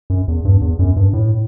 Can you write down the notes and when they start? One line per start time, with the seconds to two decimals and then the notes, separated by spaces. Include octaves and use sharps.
0.10 F#2
0.28 E2
0.45 G2
0.62 E2
0.79 F#2
0.96 G2
1.13 A2